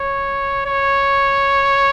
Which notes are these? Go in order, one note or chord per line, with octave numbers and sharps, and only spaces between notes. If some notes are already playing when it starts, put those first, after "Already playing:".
Already playing: C#5
C#5